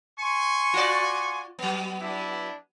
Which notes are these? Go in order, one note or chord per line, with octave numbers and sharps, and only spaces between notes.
G#5 C6 C#6
F4 F#4 D5
F#3 B3
D4 E4